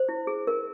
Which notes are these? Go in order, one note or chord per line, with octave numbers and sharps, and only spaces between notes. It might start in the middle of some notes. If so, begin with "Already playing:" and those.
Already playing: C5
E4
G#4
A#4